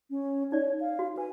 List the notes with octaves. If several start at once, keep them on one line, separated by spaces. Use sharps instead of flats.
C#4
D#4 C#5 D5
F5
F#4
B4 G#5